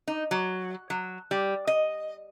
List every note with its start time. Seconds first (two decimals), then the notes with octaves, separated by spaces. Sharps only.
0.08 D#4
0.31 F#3
0.90 F#3
1.31 G3
1.67 D#5